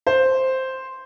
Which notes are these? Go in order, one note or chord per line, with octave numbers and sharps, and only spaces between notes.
C5